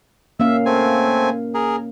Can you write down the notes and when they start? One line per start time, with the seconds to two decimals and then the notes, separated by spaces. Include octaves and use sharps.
0.40 A#3 C#4 E5 F5
0.66 A3 C4 G#5
1.54 G#4 A#4